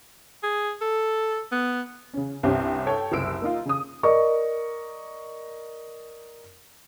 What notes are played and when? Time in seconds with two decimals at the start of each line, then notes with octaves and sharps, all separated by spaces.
0.43 G#4
0.81 A4
1.52 B3
2.13 C#3 C#4
2.43 C2 G2 C4 C#4 G4
2.86 A4 C#5 G5
3.12 F#1 C2 E6 D7
3.42 A#3 D#4 F4
3.65 C#3 D#6
4.03 A#4 D5 D#5 C#6